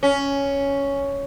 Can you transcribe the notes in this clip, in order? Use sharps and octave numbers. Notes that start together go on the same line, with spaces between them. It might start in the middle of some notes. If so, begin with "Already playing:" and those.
C#4